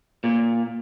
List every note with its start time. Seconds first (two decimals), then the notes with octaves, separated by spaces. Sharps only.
0.24 A#2